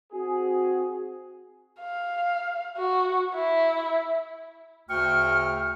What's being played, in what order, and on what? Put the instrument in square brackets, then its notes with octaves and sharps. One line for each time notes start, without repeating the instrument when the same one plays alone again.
[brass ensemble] C4 F#4 G#4
[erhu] F5
F#4
E4
[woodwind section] D2 C#3 G5 C#6 F6